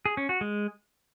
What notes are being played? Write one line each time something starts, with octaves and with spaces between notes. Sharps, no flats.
G#4
C#4
F#4
G#3